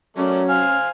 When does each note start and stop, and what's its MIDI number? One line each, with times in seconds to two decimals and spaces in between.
0.17 0.65 54
0.17 0.42 57
0.17 0.75 61
0.17 0.42 70
0.17 0.42 74
0.49 0.89 72
0.49 0.89 77
0.49 0.89 80
0.49 0.89 89